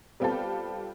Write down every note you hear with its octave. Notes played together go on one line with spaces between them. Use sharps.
G3 B3 C4 F4 G4 A4